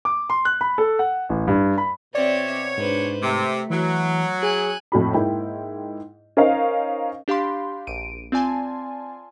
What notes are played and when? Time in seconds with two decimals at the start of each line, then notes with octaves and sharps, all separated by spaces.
0.05 D6
0.30 C6
0.45 F#6
0.61 B5
0.78 A4
0.99 F#5
1.29 A1
1.48 G2
1.78 B5
2.15 B2 C4 C#5 D5 E5
2.78 G#2 D4 B4 C5
3.22 C3 A3
3.70 E3 F#3
4.43 G#4 G#5 F#6
4.92 F2 A2 F#4 B5
5.14 G#2 A#3 E4 G5
6.37 C#4 D#4 A#4 C5 D#5 F5
7.28 D4 G4 F5 B5 C6
7.87 A#1 D7 D#7
8.32 C4 F4 D5 G#5 A5 C6